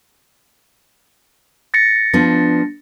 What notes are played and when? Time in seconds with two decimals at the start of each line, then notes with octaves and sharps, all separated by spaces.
1.74 A6 A#6 C#7
2.13 F3 B3 D4